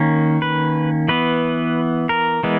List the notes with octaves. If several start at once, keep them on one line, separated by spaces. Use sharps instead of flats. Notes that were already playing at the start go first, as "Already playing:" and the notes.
Already playing: D#3 A#3 C#4
B4
E3 B3 B4
A#4
E3 G#3 B3